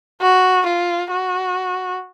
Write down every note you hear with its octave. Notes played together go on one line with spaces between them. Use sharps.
F#4
F4
F#4